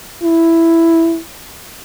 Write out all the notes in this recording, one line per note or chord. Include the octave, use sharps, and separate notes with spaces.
E4